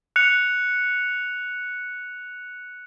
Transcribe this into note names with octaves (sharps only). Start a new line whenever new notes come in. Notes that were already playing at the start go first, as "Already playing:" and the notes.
F#6 C#7 F7